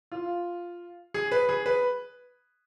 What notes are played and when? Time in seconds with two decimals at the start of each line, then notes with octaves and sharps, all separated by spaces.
0.12 F4
1.14 G#4
1.31 B4
1.49 G#4
1.66 B4